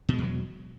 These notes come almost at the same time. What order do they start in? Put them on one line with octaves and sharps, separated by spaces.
B2 G#3 E2 F#3